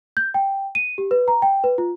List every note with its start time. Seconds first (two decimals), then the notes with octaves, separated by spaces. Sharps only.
0.17 G6
0.34 G5
0.75 D#7
0.98 G4
1.11 B4
1.28 A#5
1.42 G5
1.64 B4
1.78 F4